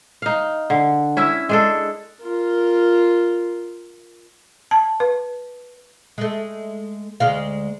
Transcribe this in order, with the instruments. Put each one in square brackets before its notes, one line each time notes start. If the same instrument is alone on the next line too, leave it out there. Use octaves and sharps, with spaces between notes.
[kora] D#4 F5
D3
C#4 E4 E5
G#3 D4 A4
[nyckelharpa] F4 A#4
[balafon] A5
B4
[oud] G#3 A3
D2 G#3 F5